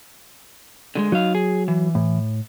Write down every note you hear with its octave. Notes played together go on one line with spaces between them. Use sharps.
D3 F3 G#3
F#3 D#4 F5
G#4
E3
A2